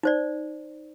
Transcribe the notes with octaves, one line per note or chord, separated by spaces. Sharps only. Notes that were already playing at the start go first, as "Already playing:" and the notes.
D#4 C5 D5